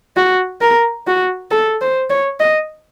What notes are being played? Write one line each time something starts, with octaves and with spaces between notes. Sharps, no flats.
F#4
A#4
F#4
A4
C5
C#5
D#5